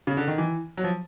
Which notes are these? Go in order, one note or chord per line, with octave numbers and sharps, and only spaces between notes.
C#3
D3
D#3
E3
F#3
F3